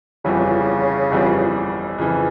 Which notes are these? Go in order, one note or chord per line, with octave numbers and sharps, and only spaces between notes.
G1 F2 C#3 E3 G3
G1 F2 E3 G3
F2 C#3 E3